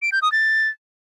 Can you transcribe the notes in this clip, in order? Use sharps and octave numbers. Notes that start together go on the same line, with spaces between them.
D7
G6
D#6
A6